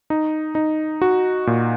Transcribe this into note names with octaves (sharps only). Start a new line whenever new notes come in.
D#4
D#4
F#4
A#2